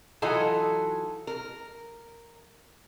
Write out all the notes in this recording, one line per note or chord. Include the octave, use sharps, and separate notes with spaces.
E3 F#3 D#4 F4 F#4 A4
A#4